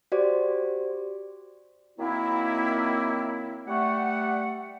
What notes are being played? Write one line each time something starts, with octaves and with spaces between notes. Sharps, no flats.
F#4 G4 C5 D5
D#3 F#3 A#3 C4 E4
G3 A3 F#5